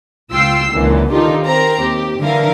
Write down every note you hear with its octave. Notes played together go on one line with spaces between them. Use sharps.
C#2 F4 G5 E6 C7
C#2 F#2 A#2 D3 E3
D3 D#3 D#4 F4 G4 A4
C4 A#4 A#5
D#2 G4
D3 E3 A#4 F5